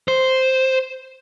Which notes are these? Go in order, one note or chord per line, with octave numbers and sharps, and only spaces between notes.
C5